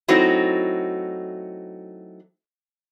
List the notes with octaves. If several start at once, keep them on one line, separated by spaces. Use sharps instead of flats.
F#3 A3 C4 D#4 E4 F#4